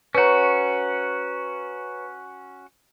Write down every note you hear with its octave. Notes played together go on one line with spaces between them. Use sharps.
C#4 F#4 B4 C#5 A#5